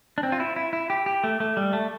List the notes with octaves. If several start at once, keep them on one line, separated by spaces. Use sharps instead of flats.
D4
C4
F4
E4
E4
E4
G4
G4
A3
A3
G3
A3